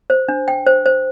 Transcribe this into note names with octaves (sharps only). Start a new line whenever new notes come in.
C5
D4
G5
C5
C5